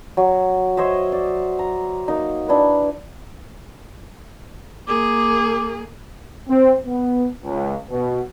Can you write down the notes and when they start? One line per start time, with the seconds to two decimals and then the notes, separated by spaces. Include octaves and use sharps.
0.17 F#3
0.77 C5 C#5 D#5 E5
1.12 D5
1.59 A#5
2.08 A#3 D#4
2.48 D4 E4 B4
4.87 A#3 G#4 D6
6.48 C4
6.86 B3
7.43 C#2
7.91 B2